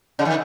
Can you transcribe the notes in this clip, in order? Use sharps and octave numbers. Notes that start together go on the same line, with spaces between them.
C#3
D#3